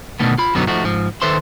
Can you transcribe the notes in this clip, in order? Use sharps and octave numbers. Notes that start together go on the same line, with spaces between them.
B2 D3 D#3 A3 B3
F4 B5
F#2 B2 D3 F#3 B3 D#4
F3 A3 D#4 F#4
G#2 F3
D#3 A4 B4 C5 E5 C6